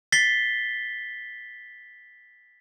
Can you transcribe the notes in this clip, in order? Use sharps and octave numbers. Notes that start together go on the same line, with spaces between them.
A6 B6 C7 G7